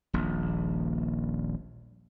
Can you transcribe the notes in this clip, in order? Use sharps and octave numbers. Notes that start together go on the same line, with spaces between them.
D#1 A#1